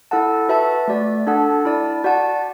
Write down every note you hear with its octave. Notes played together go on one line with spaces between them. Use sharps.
E4 A4 F#5 A5
F#4 B4 E5 A5
A3 F#4 D5
D4 A4 F#5 A5
E4 D5 A5
F#4 D5 F#5 A5